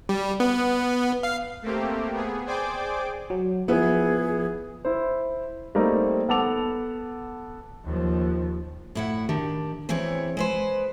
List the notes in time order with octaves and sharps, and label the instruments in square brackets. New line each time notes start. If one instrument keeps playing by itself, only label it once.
[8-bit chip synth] G3
B3
F5
[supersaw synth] A3 A#3 C4 G4
B3 G#4
G#4 C5 D5 G5 G#5 D6
[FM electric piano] F#3
[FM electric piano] F3 [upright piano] B3 E4 [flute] G#4
[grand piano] E4 C5
G3 A3 A#3 C4 D#4
B3 A4 F#5 A5 D6 F7
[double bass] D#2 F3
[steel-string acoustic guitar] A2 E4 F#5
D#3 D4 G4
E2 E3 C4 E4 C#5
G#3 B4 C5